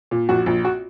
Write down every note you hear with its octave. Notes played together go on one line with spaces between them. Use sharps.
A#2
A#1 F#4
A#1
F#4